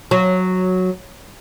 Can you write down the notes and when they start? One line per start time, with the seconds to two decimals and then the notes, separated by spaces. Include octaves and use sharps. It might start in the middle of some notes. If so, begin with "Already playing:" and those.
0.11 F#3